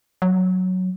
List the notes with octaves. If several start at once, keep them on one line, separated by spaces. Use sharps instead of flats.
F#3